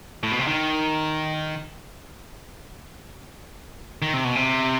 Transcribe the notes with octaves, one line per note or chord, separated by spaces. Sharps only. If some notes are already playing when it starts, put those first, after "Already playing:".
A2
B2
C3
D#3
D#3
C3
B2
C3